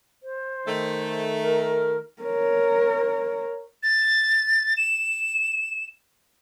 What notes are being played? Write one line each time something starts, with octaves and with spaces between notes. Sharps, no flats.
C5
D#3 A3
A#4
A#4 C#5
A6
E7